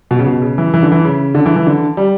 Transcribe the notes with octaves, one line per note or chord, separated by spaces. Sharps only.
B2
C#3
B2
C#3
E3
E3
D3
E3
C#3
D3
E3
E3
D3
G3